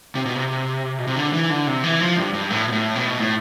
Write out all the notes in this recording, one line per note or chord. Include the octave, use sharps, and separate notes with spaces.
C3
B2
C3
B2
C3
D3
E3
D3
C3
E3
F3
G2
G2
A2
B2
A2
B2
A2